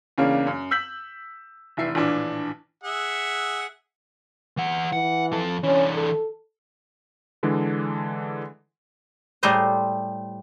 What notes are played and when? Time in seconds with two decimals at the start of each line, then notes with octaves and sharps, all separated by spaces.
0.18 E2 C#3 A#3 C#4 D4
0.47 F#2
0.71 E6 G6 B6 F#7
1.77 F1 E3 E4 E5 C7
1.95 A#1 A2 E3 D4
2.83 G#4 E5 F#5
4.57 E3 F#5
4.93 E3 F#5
5.32 F2 A4
5.63 E3 C#4 D4
5.94 A4
7.43 D3 E3 G#3 D4
9.43 A2 G3 A3 G#4 C5 A#5